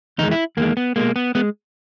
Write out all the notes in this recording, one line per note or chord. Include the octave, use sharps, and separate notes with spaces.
E2 D#3 G#3 D#4
E4
E2 D#3 G#3 A#3
B3
B2 G#3 A#3
B3
G#3 B3